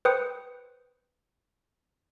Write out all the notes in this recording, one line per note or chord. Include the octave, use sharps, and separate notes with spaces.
B4 C5 G5 D#6 C#7